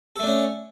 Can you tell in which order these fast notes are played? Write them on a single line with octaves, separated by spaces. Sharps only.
A4 A3 D4 C#4